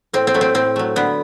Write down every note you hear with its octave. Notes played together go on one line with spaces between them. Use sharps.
A2 C4
C4
F#3 A3
C4
A2 C4
F#3 A3
D3 B3